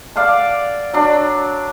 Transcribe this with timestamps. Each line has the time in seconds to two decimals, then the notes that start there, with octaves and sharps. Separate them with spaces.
0.16 D5 F5 F#5 A5
0.93 F#3 D4